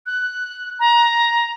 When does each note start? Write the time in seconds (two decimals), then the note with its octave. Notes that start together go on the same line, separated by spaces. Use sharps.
0.06 F#6
0.80 A#5